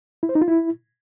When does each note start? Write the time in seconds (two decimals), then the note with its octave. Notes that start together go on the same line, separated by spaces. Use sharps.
0.23 E4
0.29 C5
0.35 D#4
0.41 F4
0.48 E4